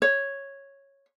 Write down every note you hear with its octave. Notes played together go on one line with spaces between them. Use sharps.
C#5